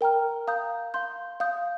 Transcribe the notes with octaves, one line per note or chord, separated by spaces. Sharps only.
A#4 G5 A#5 F6
F5 A#5 D#6 G6
F5 C6 G6
F5 D#6 G6